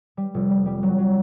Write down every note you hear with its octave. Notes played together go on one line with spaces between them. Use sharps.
G3
F1
G3
G3
F#3
F#3